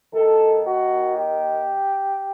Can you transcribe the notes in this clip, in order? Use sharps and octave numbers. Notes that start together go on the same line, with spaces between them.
D#2 D#3 A4
F#4
G4